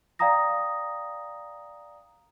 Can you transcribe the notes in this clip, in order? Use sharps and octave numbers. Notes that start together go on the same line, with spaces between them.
D5 F5 G5 A#5 D#6 A#6